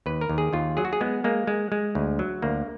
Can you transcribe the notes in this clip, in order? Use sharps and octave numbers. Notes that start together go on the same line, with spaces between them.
D#2 B4
A#4
D#2
G#4
D#2 F4
F#3 G#4
F#4
G#4
G#3 B3
G#3 A#3
G#3
G#3
D2
F#3
D2 A#3